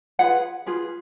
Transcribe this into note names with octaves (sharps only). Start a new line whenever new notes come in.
F4 G#4 B4 F#5
F4 G#4 B4